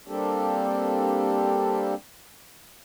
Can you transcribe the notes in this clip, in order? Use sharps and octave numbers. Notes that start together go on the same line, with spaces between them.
G3 A#3 C4 D4 G4 A4